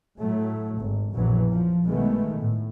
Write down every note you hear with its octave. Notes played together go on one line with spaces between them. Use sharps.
A2 F#3 A3
G#1
A#1 F#2 B2 E3 F#3
F3
B1 B2 D#3 G#3 A3 B3
A2